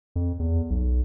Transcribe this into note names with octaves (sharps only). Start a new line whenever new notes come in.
F2
E2
B1